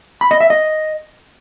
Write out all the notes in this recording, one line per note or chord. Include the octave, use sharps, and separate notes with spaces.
B5
D#5
E5
D#5